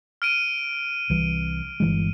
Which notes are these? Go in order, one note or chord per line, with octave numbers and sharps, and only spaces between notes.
F6 D7 D#7
C2 E3
G1 E3 G#3